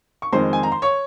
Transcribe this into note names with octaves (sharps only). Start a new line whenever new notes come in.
C#6
F2 D#3 G#3 C5 C6
G#5
A#5
C6
C#5 C#6